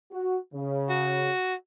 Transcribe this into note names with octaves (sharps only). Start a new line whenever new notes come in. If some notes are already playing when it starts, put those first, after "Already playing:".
F#4
C#3
F#4